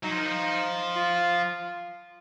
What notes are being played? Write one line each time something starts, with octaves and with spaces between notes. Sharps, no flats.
F#3 D#4
F3
D#3
F3
F4